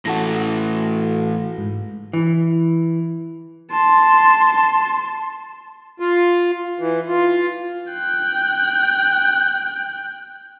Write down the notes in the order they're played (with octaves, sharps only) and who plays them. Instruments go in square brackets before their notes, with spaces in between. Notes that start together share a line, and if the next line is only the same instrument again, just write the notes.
[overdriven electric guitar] A2 E3 [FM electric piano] F#4 A4 A#6
[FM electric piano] G#2
[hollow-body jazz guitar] E3
[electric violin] A5 C6
[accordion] F4
E3
F4
[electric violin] G5 F#6